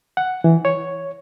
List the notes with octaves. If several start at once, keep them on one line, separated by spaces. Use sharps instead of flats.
F#5
E3
C#5